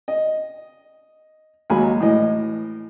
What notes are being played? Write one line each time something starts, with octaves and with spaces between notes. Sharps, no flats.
D#5
D#2 F#3 G#3 G#5 B5
A2 E3 D#5